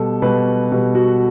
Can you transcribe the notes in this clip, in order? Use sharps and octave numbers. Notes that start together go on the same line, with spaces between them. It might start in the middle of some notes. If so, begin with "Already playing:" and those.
Already playing: B2 G3 A4
B2 G3 B4
B2 G3
F#4